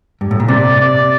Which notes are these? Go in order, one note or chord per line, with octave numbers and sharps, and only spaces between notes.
G2
A2
A#2
C3 D5
D5